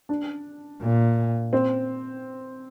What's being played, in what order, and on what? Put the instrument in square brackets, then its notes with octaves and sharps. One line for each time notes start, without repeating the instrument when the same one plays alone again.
[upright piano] D4
[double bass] A#2
[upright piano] C4